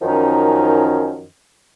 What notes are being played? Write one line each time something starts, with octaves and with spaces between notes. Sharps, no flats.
F#2 D#3 F3 C#4 D#4